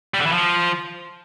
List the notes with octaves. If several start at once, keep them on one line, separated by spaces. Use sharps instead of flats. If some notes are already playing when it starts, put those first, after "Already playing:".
G3
D3
E3
F3